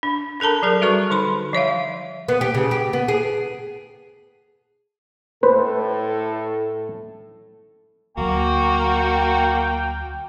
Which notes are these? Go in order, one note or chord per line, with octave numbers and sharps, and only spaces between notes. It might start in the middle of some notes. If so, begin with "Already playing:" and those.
D4
D4 A4 A#4 A5 A#5
F#3 G#4 A#4
G3 F#4 A4 B4 C#6
D3 D#4 B5 C6
F3 C#5 E5 F5
B3
G4
C#3
G4
B3
G#4
A2 A4 B4 C5
D2 F#3 A#3 F#4 G5